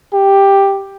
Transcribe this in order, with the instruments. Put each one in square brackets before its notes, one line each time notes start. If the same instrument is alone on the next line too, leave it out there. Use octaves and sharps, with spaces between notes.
[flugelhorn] G4